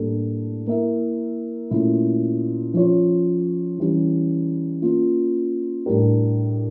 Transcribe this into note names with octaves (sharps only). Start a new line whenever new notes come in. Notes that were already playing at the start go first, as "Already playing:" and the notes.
Already playing: A2 G3 A#3 D4 A4
A#3 E4 A#4 E5
A#2 A3 C#4 E4
F3 C#4 F4 C#5
E3 G3 C#4
A#3 C#4 F4
A2 G3 D4 G4 A#4